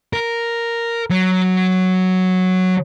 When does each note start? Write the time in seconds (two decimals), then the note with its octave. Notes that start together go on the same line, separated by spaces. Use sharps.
0.13 A#4
1.10 F#3